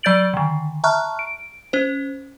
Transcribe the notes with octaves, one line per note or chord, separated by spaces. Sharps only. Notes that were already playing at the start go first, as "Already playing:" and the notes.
F#3 D5 G6 A6 D7 F#7
D3 D#3
E5 A5 A#5 C#6 F6 F#6
D7
C#4 C5